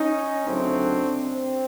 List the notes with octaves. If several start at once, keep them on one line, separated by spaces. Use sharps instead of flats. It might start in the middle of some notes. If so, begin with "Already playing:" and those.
Already playing: C#4 D#4
D2 C#3 F#3 A3 C4 D4
C4